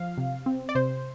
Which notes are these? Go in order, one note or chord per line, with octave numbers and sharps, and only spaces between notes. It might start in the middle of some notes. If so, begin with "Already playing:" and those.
Already playing: F3 F5
C3
C4
D5
C3 C5